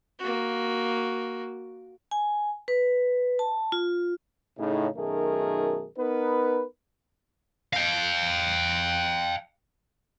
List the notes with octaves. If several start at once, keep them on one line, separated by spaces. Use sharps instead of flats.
A#3 F#4
G#5
B4
A5
F4
A2 C#3 D#4
B1 F#2 D#3 A3 G#4 A#4
B3 D#4 A#4 B4
F5 G5